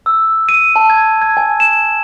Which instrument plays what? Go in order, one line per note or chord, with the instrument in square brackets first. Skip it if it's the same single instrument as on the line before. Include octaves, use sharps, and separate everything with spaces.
[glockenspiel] E6
D#7
A5
G#6
G#6
G#5
E7